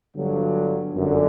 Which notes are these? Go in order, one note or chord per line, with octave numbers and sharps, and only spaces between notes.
G1 G2 D3 F#3
G1 F#2 D3